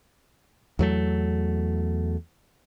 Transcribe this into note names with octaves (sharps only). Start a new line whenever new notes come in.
E2 F#3 A3